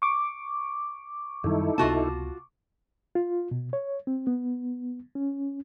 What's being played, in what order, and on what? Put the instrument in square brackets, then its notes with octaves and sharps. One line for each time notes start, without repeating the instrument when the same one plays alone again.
[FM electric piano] C#6 D6
[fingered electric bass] F#2 D#3 G3 [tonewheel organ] D#4 E4 A4
[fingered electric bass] C#2 C3 B3 [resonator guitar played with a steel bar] F4 F#4 A5
[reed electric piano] F4
B2
C#5
C4
B3
C#4